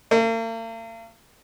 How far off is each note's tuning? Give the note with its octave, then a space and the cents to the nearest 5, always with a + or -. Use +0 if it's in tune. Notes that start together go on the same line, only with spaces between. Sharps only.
A#3 -45